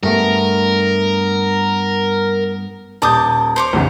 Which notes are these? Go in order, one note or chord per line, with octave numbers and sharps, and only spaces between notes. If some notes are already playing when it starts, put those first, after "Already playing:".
G2 A3 B3 A#4
D#1 A5 D6 D#6 G6
C5 C#5 D6
B1 E2 C#3